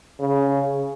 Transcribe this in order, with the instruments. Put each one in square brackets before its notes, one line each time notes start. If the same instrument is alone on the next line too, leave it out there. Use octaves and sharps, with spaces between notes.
[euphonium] C#3